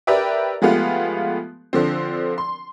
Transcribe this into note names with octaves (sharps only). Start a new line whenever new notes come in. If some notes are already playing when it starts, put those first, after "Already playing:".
G4 A#4 B4 D5 E5 G5
F3 G#3 A3 B3 F4 G4
D3 F3 C4
C6